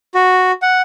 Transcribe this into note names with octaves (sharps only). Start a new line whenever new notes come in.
F#4
F#5